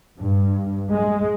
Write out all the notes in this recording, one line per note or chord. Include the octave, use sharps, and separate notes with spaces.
G2
G#3